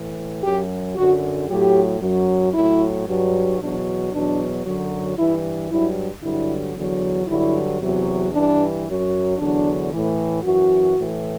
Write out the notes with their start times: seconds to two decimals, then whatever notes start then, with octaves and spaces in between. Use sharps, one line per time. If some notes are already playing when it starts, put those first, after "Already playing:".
Already playing: A2 E3
0.43 F#2 F#3 G4
0.96 F#2 D3 F#3 F#4
1.48 A2 F#3 G4
2.01 F#2 F#3
2.54 A2 F#3 E4
3.06 G2 F#3
3.59 E2 B2 F#3 D4
4.12 E2 B2 F#3 D4
4.64 F#2 D3 F#3
5.17 G2 E3 E4
5.70 G2 F#3 E4
6.22 G2 D3 F#3 E4
6.75 E2 D3 F#3
7.27 G2 D3 F#3 E4
7.80 E2 C3 F#3
8.33 G2 E3 D4
8.86 F#2 F#3
9.38 E2 D3 F#3 D4
9.91 A2 E3
10.44 F#2 E3 F#4
10.96 A2 E3